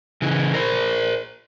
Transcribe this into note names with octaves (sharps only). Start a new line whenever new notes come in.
C#3 E3
A#4 C5